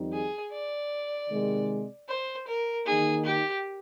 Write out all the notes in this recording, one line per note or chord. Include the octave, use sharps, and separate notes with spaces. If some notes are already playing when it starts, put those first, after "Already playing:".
Already playing: F2 D#3 G3 C4 D#4
G#4
D5
C3 D#3 G#3
C5
A#4
D#3 A#3 D#4 G#4
G4